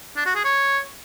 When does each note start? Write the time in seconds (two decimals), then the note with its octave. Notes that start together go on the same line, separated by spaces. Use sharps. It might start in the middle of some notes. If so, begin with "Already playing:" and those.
0.17 D4
0.26 F#4
0.35 G#4
0.45 C#5